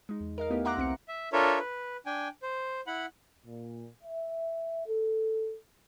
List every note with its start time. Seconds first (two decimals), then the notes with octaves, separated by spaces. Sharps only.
0.09 G#3 D#4
0.20 E2
0.38 A#4 D#5 F5
0.50 A3 B3 D#4 E4 G4
0.65 E5 F#5 A#5 C6 D6 F#6
0.77 C2 C4 A#5 C#7
1.08 E5
1.33 D4 F4 A4 A#4 C#5 E5
1.59 B4
2.06 D4 G5 G#5
2.42 C5
2.87 E4 F#5 B5
3.45 A#2
4.03 E5
4.87 A4